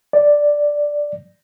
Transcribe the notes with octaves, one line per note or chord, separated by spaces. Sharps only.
D5